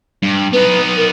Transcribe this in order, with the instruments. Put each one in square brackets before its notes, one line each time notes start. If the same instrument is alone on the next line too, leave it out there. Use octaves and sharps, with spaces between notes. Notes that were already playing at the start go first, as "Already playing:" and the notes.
[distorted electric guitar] G2
[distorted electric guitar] B3 D#4 [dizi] B4
[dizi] A#4